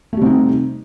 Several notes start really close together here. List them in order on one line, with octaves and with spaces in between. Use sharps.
A3 G3 C3 D#4